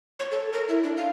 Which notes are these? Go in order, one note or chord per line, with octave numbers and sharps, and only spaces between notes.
C#5
A4
A#4
E4
D4
F5